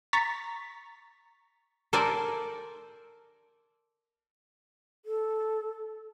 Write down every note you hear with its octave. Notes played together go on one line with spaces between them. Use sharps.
A#5 C#6 A6 B6
A4 A#4 C5 D5 G#5
A4